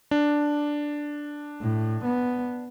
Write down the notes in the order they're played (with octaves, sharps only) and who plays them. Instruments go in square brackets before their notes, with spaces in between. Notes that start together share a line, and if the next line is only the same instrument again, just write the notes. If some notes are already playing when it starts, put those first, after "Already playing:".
[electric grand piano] D4
[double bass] A2
B3